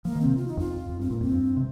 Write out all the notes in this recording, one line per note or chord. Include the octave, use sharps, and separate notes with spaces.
F3 A#3
D#3
C3 C4
F4
D#4
F2 F4
F2
G2 C4
A#2 A#3
F2 C4
G2
C3